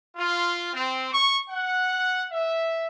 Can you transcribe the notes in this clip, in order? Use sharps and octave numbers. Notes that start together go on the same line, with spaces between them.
F4
C4
C#6
F#5
E5